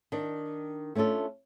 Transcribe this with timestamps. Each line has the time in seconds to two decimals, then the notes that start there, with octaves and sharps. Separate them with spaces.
0.12 D#3 D4
0.95 A3 C#4 D4 F4 A4